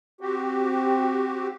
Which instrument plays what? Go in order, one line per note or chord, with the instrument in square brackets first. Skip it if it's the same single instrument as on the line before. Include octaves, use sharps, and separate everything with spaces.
[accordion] C4 F#4 G4